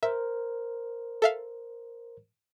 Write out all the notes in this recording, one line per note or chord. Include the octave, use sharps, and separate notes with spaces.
A#4 C5 E5
A4 E5 F5